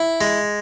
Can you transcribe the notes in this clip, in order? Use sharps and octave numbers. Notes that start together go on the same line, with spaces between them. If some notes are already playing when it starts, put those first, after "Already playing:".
Already playing: E4
G#3